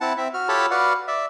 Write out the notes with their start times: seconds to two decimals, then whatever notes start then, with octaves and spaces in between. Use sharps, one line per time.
0.01 C4 E4 F#5 A5
0.17 C4 E5
0.34 F#4 F6
0.48 F4 G4 A4 C#5 A5 B5
0.71 F#4 B4 D5 F5 F#5
1.08 D5 E5